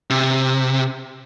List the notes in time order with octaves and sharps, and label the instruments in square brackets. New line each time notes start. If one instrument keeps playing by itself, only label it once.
[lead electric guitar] C3